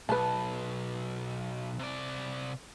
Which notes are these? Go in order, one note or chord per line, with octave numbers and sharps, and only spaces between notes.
B1 B4 A5
C3 D5